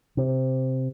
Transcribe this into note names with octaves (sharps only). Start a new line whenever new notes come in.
C3